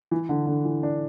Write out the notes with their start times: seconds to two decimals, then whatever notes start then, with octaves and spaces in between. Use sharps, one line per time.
0.11 E3
0.29 D3
0.47 D3
0.65 E3
0.83 D4